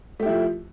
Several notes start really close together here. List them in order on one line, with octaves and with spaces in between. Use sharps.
A3 G4 E4 F3